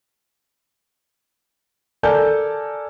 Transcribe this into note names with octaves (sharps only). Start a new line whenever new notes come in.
A4 A#4 D5 G#5 A5 G6